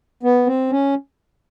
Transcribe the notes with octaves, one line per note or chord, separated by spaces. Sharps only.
B3
C4
C#4